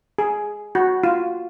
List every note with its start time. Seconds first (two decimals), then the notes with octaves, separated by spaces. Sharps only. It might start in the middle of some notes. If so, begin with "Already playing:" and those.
0.18 G#4
0.75 F#4
1.04 F4